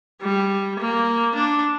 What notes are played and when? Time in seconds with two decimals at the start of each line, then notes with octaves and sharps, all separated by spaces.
0.22 G3
0.79 A#3
1.35 D4